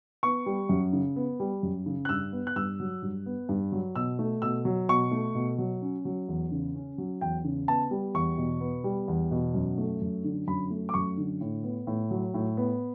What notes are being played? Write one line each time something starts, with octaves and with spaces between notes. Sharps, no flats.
B3 C#6
G3
F#2
C#3
B3
G3
F#2
C#3
F#6
G2 E6
B3
F#6
G2 E6
F#3
G2
B3
G2
F#3
B2 E6
A3
B2 E6
F#3
B2 C#6
A3
B2
F#3
C#4
F#3
E2
C#3
C#4
F#3
E2 G5
C#3
B3 A5
G3
E2 C#6
B2
B3
G3
E2
B2
F#2
A3
F#2
D3
F#2 B5
A3
D6
F#2 C#6
D3
A2
B3
A2
F#3
A2
B3